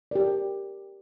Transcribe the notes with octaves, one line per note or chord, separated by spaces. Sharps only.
G4 A#4 D5